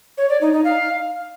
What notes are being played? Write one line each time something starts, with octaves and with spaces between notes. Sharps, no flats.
C#5
D5
D#4
D#4
F5